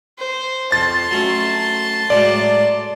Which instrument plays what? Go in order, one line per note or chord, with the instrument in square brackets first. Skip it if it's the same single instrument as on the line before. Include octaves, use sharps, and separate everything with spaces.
[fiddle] C5
[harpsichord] F2 [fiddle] A5 C6 [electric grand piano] A6
[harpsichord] F#3 A3 C#4
[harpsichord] A2 F#3 G#3 [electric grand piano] D5